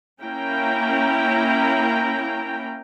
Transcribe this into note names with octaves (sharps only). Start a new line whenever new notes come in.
A#3 C#4 E4 G5 A#5